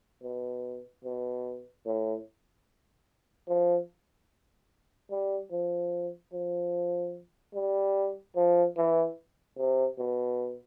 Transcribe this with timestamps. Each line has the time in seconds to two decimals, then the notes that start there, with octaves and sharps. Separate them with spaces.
0.23 B2
1.05 B2
1.86 A2
3.48 F3
5.11 G3
5.51 F3
6.33 F3
7.54 G3
8.36 F3
8.77 E3
9.58 C3
9.98 B2